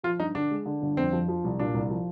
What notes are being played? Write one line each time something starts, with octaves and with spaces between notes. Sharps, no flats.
F3 F4
G2 D#4
D3 D4
G#3
D3
G1
F2 C4
F3
F3
C2
A#2 D4
C2
F3